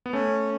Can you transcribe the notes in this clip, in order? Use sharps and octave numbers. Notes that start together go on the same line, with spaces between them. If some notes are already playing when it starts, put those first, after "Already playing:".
B3
A3 C#4